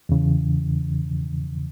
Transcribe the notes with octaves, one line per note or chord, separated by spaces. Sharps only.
E2 C#3 E3